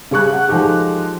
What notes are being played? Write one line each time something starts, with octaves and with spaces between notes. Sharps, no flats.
C#3 G3 C#6 F#6
F#5
F3 G#3 D#4 G4 A4